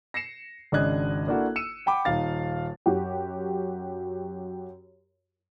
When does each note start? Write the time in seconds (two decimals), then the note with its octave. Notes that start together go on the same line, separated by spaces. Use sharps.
0.14 A#6 C7 C#7 E7
0.72 G#1 C#3 D4 D#5 F#6 G#6
1.27 A#3 D4 E4 F#4 A4
1.56 E6 C#7 D#7 E7
1.86 F#5 G5 B5 D6
2.05 D#1 D#4 F5 A6
2.86 F#2 F#4 G4